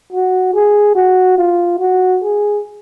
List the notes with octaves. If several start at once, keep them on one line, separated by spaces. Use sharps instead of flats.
F#4
G#4
F#4
F4
F#4
G#4